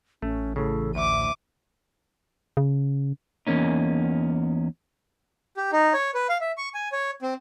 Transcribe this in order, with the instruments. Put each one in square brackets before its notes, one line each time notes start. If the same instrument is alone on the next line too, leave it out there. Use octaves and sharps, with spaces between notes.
[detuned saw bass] A1 [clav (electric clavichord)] A3 [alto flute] C#4
[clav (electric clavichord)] A2 C#3 [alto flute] A4
[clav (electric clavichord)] D2 [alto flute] E5 [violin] D6 D#7
[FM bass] C#3
[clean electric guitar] E2 A#3 C#4 D#4
[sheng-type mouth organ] G4
D#4
C#5
B4
F5
E5
C#6
G#5
C#5
C4